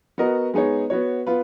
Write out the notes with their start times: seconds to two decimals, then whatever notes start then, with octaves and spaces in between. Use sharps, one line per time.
0.18 B3 F#4 A#4 D#5
0.54 G#3 B3 D#4 G#4 C#5
0.90 B3 F#4 C#5
1.27 B3 F4 B4